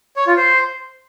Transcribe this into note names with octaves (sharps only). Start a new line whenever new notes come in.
C#5
F4
C5